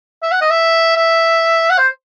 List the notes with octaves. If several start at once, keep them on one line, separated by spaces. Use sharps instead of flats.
E5
F#5
D#5
E5
E5
F#5
C5